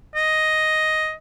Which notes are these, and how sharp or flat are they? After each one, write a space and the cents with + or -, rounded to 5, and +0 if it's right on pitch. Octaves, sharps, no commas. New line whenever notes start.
D#5 +5